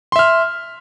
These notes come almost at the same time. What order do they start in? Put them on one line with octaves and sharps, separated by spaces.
C6 E5 F6